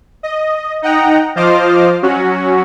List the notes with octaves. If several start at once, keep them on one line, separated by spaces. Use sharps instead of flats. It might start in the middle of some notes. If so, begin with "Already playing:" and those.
D#5
D#4 D#5 F#5 G5 A#5
F3 F4 C5 D#5 D6 F6
F#3 C#4 F#4